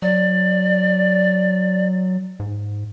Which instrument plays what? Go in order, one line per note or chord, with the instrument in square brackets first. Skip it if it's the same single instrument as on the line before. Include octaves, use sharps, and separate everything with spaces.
[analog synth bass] F#3 [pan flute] D5
[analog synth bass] G#2